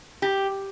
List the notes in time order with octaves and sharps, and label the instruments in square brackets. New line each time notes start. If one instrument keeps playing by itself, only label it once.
[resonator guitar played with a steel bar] G4